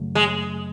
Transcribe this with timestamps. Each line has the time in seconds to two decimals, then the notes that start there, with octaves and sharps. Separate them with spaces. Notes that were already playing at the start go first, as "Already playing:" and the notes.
Already playing: F#2 C#3 F#3 A3
0.15 G#3